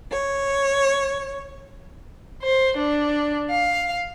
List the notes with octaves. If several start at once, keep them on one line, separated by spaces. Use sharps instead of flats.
C#5
C5
D4
F5